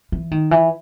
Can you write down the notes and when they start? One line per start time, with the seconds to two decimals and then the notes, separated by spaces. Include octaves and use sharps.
0.12 E3
0.31 D#3
0.51 E3